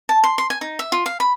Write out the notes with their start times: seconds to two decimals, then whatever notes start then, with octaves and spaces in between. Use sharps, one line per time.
0.09 A5
0.24 C6
0.38 C6
0.50 G#5
0.61 D#4
0.79 E5
0.92 F4
1.06 F5
1.20 B5